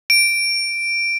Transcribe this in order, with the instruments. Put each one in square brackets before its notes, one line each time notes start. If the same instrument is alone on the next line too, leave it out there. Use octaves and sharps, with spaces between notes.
[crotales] D7